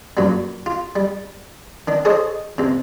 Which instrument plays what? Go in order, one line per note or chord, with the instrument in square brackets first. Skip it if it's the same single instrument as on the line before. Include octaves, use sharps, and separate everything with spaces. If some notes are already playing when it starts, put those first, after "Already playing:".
[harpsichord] F#2 A#2 F#3 G3
F4
G3
D#3 D4
G#4 A4 C5 C#5 D#5
C#2 C3